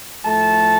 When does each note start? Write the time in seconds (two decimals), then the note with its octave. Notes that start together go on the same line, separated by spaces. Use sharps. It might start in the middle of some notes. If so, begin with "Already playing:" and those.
0.24 A2 F3 A3 A5